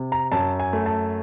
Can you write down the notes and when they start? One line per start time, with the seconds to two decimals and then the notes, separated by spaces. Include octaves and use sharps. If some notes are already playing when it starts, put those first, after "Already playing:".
Already playing: C3
0.12 A#5
0.32 F#2 A5
0.60 G#5
0.73 A3
0.86 A5